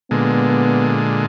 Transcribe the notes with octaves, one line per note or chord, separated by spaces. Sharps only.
A#2 D3 G#3 B3